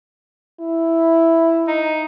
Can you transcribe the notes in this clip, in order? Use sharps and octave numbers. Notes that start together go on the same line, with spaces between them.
E4
D#4